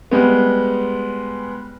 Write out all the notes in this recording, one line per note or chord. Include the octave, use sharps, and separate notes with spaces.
G3 G#3 B3